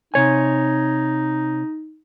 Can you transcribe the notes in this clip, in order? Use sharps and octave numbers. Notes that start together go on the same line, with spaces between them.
C3 D#4 C#5 G#5